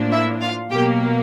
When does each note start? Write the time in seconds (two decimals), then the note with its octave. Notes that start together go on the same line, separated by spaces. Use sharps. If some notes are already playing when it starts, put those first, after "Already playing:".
Already playing: A2 F3 A#3 D4
0.12 E4 E5
0.41 F4 F5
0.71 B2 F#3 A#3 G4 G5